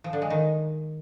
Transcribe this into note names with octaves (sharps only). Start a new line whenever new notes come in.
F3
D3
G#3
D#3